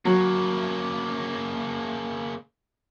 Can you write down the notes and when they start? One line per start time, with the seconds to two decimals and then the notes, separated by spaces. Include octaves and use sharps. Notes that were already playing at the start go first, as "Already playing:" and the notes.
0.05 C#3 F#3 A#3